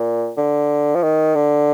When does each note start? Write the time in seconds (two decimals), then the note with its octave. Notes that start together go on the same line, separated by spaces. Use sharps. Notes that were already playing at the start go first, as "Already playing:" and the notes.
Already playing: A#2
0.38 D3
0.95 F3
1.03 D#3
1.35 D3